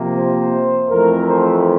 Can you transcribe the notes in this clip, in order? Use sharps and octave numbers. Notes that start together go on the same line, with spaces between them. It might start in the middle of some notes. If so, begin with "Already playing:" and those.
Already playing: C3 F3 A#3
C5
F2 E3 A3 A#4
C5